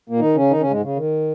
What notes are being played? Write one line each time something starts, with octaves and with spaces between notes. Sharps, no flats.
A#2 A#3
D#3 D#4
C#3 C#4
D#3 D#4
C#3 C#4
G#2 G#3
C#3
D#3